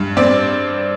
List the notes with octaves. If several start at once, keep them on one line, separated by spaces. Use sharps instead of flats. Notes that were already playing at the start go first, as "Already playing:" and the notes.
Already playing: G2
C4 D5